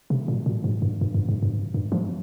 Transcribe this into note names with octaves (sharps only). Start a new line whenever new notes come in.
C3
A#2
A#2
G#2
G2
G2
G2
G#2
G2
G2
F3